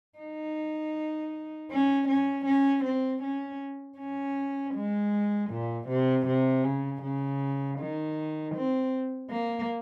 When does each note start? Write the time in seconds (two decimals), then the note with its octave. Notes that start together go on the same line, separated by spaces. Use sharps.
0.18 D#4
1.71 C#4
2.09 C#4
2.46 C#4
2.84 C4
3.23 C#4
3.99 C#4
4.74 G#3
5.51 A#2
5.88 C3
6.27 C3
6.64 C#3
7.02 C#3
7.79 D#3
8.55 C4
9.30 A#3